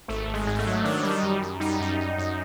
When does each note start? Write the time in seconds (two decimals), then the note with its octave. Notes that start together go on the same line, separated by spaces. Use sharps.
0.08 G#1 A3
0.27 G#1
0.34 G#3
0.47 G#2
0.55 G#3
0.59 A3
0.66 F#3
0.84 D#3 D4
1.03 G3
1.10 D#4
1.23 F#2
1.42 F#2
1.60 G3 D#4
1.80 F#2
1.99 F#2
2.18 F#2